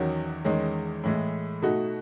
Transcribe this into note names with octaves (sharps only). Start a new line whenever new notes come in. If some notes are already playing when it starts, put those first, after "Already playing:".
Already playing: E2 D#3 F#3 C#4 F#4
E2 D#3 G#3 C#4
A2 E3 G#3
B2 A3 D#4 F#4